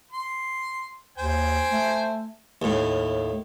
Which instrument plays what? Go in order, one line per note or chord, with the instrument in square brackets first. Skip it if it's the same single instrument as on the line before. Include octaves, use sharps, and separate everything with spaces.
[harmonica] C6
[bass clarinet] D#2 [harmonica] C5 G5 G#5
[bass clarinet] A3
[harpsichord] D#2 A2